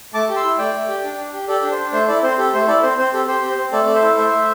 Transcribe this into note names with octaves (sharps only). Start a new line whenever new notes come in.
A3 A5 D6
G4
C6 E6
E4
A3 D5 G5
A3
G4
D4
D4
G4
G4 A4 D5
D4
C5
D4
A3 C5
E4 A4 D5
C4 C5
G4 A4
A3 C5
E4 A4 D5
C4 C5
C4 C5
G4 A4
G4 C5
C4
C5
C4
A3 A4 D5
A4 D5
C5 E5
E4
A3 C5 E5
A3